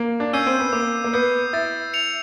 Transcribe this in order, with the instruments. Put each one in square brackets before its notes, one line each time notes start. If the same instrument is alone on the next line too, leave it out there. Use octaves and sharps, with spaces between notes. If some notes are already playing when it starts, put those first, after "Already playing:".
Already playing: [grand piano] A#3
D4
[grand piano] C#4 [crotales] E6 G6 C7 D#7
[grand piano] C4
B3
[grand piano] A#3 [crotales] D6
[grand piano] A#3
[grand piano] B3 [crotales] G6 C7
[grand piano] E4 [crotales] A6
[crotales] C#7 F7